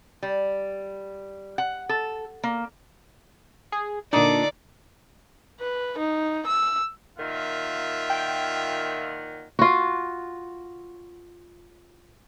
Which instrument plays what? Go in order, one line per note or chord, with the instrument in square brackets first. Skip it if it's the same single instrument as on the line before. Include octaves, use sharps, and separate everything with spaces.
[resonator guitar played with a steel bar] G3
F#5
A4
A#3
[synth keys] G#4
[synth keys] A#2 D4 [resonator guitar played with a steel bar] D3 D#4 [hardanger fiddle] D5
[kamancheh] B4
D#4
E6
[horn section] A#2 D#3 F#5 [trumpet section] F4 E5
[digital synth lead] G5
[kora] F4 F#4